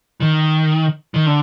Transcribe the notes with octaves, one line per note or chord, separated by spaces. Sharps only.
D#3
D#3
D3